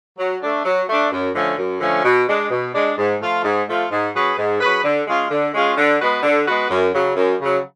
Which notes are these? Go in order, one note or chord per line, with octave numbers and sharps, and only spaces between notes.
F#3
A3 D4
F#3
A3 D4
F#2
D3 F3 A3 C#4
F#2
D3 F3 A3 C#4
B2
G#3 D4
B2
G#3 D4
G#2
F3 A3 F4
G#2
F3 A3 F4
G#2
F#3 C#4 G#4 B4
G#2
F#3 C#4 G#4 B4
D3
G#3 C#4 F4 G#4
D3
G#3 C#4 F4 G#4
D3
G#3 B3 F#4 B4
D3
G#3 B3 F#4 B4
F#2
C#3 F#3
F#2
C#3
F#3